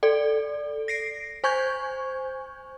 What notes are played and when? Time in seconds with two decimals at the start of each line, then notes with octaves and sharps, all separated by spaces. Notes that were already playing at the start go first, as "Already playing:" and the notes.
0.03 A4 D5
0.88 A#6 C7 D7
1.44 C5 G#5 C#6 G6 G#6